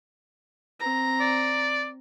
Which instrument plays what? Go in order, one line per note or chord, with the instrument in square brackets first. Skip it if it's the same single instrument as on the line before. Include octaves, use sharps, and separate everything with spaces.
[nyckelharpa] C4 A#5
[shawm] D5